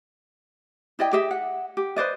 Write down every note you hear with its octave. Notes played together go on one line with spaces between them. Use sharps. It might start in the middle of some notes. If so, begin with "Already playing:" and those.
E4 D5 D#5 G5
G4 G#4 D#5 E5
F#5
G4
B4 C5 D5 D#5